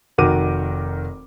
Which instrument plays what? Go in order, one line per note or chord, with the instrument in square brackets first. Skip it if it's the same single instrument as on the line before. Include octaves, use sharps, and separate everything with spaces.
[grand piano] F1 D#3 F#4 A#4 D6 D#7